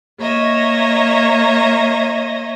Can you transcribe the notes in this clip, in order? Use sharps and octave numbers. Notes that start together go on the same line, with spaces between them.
A#3 C#5 D#5 E5